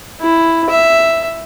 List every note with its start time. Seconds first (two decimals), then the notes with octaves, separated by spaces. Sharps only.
0.21 E4
0.69 E5